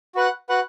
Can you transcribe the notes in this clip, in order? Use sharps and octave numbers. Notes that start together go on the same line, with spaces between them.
F#4 B4 F#5
F#4 B4 F#5